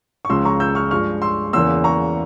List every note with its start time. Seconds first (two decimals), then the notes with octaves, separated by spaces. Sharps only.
0.25 C#6
0.29 C#2 C#3 F3 G#3 C6 E6
0.45 A#5 C#6
0.60 E6 G6
0.75 C#6 F6
0.91 G2 F3 G#3 C#6 F6
1.22 C6 E6
1.53 E2 C#3 E3 A#3 C6 E6
1.84 A#5 C#6